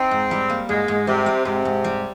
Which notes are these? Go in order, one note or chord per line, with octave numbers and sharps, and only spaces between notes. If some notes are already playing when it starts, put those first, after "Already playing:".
Already playing: C4 D#4
G#2
G3
A#3
G#2 G#3
G#2
C3 G3
C4
G#2 C3
G#2
G3